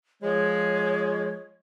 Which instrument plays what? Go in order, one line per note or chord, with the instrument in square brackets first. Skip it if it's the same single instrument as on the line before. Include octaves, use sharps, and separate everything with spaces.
[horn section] F3 G#3 [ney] C#5